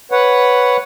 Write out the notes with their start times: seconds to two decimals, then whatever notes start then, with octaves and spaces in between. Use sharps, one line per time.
0.11 B4 C#5 F#5